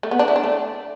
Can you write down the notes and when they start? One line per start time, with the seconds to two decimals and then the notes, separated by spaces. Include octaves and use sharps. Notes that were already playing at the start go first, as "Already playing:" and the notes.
0.03 A3
0.11 B3
0.19 D4
0.28 E4
0.36 D4
0.44 A3